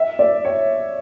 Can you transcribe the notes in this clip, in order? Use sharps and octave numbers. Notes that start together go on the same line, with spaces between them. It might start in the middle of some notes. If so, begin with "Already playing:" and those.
Already playing: E5
D5
C#5